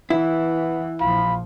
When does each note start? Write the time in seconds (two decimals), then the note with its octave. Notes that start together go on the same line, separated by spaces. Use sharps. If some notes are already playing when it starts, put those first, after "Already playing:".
0.10 E3 B3 E4
1.01 A#1 F3 F4 B5